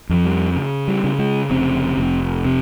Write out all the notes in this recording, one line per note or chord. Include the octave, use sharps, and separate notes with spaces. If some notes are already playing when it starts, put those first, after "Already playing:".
F2 F3
G3
C#3
G3
C#3
G#3
F1 C4
F1
C3 C4